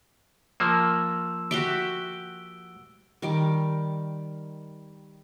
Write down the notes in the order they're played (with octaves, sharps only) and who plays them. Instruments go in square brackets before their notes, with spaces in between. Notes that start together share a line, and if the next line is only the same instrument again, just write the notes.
[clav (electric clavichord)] F3 A#3 [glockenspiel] E6 E7
[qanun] F#4 G4 E5 [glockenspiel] D7 G7
[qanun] D#3 G3 D6